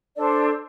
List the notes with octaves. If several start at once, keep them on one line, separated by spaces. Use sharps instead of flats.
D4 A4 C5 D5